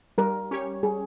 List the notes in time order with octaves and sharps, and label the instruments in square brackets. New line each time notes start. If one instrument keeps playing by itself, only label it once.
[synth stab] G3 [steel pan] A#4
[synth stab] C#4 G4 C#5
[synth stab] G3 [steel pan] G#4